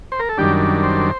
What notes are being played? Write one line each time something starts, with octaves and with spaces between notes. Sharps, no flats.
C5
A#4
A4
F#2 D#3 G3 D4 G4
C5